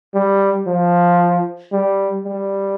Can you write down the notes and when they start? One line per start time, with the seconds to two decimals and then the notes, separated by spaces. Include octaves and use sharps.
0.15 G3
0.67 F3
1.72 G3
2.24 G3